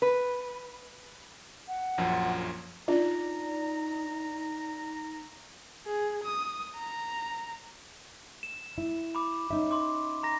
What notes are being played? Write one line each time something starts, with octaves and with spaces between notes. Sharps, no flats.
B4
F#5
A#1 F#2 F3
D4 D#4 F4 A#5
G#4
D#6
A#5
E7
E4
B5 D6
C#4 D#4 E5
C6 D6
A#5 A#6